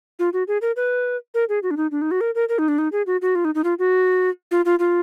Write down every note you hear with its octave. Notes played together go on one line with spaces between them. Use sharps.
F4
F#4
G#4
A#4
B4
A#4
G#4
F#4
D4
D#4
D4
D#4
F#4
A#4
A#4
A#4
D#4
D4
D#4
G#4
F#4
F#4
F4
D#4
D#4
F4
F#4
F4
F4
F4